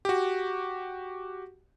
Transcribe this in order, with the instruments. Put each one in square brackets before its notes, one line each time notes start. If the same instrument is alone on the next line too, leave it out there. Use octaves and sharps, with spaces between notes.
[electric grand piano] F#4 G4